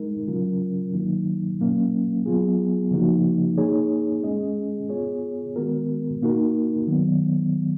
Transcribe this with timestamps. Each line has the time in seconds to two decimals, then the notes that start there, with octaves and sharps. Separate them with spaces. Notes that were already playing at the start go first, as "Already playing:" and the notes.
Already playing: G#3 D#4 A#4
0.28 C#3 F#3 C#4 F4 A#4
0.94 D#3 F#3 A#3 D#4
1.60 B2 F#3 A#3 C#4
2.26 F#3 B3 F4 G#4
2.91 C#3 F3 A#3 D#4 F#4
3.58 A#3 D#4 G#4 C#5
4.23 G#3 C#4 G#4 D#5
4.89 B3 F4 G#4 C#5
5.56 D#3 G#3 B3 F#4 A#4
6.22 B2 A#3 D#4 F#4 A#4
6.87 D#3 F#3 B3